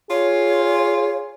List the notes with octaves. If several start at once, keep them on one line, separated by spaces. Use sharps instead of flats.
F4 G#4 C#5